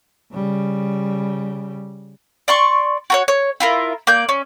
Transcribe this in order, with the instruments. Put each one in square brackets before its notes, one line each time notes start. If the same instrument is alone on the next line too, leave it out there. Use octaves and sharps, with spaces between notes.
[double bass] C#3 G3
[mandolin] D5 C6 C#6
F#4 A#4 C#5
C#5
E4 F4 A#4
A#3 D5 G6
C#4